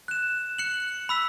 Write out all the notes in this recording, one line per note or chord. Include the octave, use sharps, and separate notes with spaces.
F#6 E7
F#6 C#7 F#7
B5 E6 B6